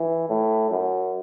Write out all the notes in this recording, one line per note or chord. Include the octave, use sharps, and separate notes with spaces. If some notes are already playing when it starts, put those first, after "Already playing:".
Already playing: E3
A2
F#2